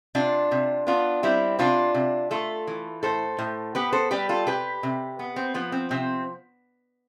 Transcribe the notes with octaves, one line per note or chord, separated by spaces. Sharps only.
C3 D4 F4
C3
B3 D4 F4
G3 C4 E4
C3 D4 F4
C3
A3 F4 A4
E3
A2 A4 C5
A2
B3 G4 B4
A4 C5
G3 G4 B4
F4 A4
C3 G4 B4
C3
B3
C4
F3 B3
C4
C3 C4